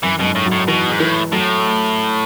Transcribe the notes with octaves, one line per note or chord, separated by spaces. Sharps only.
F#2 E3
F#2 B2
G#2
A2
F#3
A2
B2 E3
G#2
A2 E3
A2 F#3